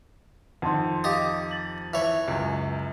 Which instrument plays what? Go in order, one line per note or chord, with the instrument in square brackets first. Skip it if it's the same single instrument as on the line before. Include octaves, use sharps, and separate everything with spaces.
[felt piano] F2 D#3 [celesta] F#5 A5 C6
[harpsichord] G4 D#6 [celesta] D#5 F5 A6
[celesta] A6 F#7
[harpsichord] E3 C#5
[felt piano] C#2 F#2